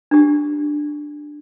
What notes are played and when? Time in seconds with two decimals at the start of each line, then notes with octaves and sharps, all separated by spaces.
0.11 D4 G4